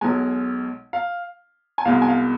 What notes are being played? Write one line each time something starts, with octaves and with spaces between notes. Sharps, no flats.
B1 B2 G#3 G#5
F5
G#5
C2 B2 G#3 F5
G#5
F5